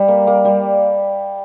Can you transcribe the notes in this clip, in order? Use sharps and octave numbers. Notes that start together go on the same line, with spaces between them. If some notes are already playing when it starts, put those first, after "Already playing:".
Already playing: G3
A#3
A#3
G3